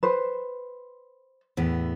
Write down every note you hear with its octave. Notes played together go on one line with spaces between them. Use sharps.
B4 C5
E2 A2 B3